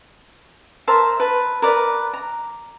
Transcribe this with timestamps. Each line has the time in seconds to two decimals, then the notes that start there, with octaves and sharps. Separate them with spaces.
0.87 A#4 C5 E5 A5
1.20 B4 A5
1.62 A#4 B4 D5
2.13 A#5